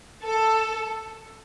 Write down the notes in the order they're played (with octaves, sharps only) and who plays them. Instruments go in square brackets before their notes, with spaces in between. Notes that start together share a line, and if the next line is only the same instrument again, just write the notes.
[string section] A4